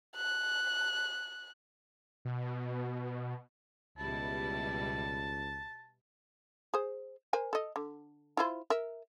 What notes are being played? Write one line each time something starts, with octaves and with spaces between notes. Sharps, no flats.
F#6
B2
C#2 B2 G3 E4 A5
G#4 C5
A#4 C5 G#5
A4 D#5
D3
E4 F4 C5
A#4 E5